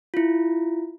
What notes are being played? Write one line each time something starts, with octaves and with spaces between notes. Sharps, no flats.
E4 F4